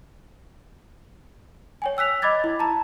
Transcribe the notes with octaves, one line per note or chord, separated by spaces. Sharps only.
C#5 G5 G#5
G5 E6 F#6 B6 F7
D#5 B5 D6 G#6 A6
E4
A5 A#5